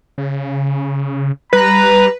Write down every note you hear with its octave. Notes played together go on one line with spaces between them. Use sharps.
C#3
G3 B4 A#5